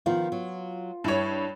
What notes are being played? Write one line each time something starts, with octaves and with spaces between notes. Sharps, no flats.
D#3 F3 B3 F4
F#3
G2 G3 E4 C#5